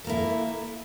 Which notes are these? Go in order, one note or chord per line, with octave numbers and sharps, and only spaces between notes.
A#3 E4 A4